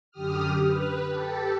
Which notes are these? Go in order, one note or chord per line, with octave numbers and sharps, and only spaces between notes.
F#2 D3 G4 D#6 F6
B4
G4 A4